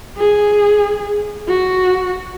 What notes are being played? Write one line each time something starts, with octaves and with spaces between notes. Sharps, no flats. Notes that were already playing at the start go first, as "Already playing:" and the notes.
G#4
F#4